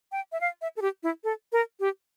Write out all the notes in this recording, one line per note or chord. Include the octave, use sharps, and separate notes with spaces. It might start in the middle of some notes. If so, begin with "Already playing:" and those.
G5
E5
F5
E5
A4
G4
E4
A4
A#4
G4